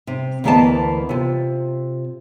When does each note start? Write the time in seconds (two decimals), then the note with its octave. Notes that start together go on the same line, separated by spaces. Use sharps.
0.07 C3
0.44 D2 E3 A#3 B3 D#5 A5
1.09 C3 F4